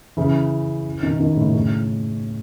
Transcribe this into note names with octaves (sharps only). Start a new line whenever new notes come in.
C#3 E3
B2 D#3
B2 D#3
A2 C#3
A2 C#3